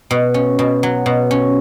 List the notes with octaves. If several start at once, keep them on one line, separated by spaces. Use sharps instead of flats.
B2
C#4
B2
F#3
B2
C#4